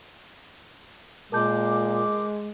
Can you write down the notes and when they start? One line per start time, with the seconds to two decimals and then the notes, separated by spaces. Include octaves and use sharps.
1.32 A#2 G#3 A#4 A5 D6 G6